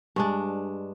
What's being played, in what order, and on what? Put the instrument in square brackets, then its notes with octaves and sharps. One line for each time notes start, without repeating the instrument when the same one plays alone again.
[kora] G2 G#3 D4